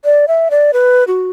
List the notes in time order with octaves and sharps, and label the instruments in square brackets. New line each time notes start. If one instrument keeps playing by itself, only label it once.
[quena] D5
E5
D5
B4
F#4